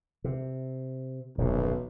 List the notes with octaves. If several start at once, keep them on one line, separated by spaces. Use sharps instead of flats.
C3
D#1 B1 F#2 C3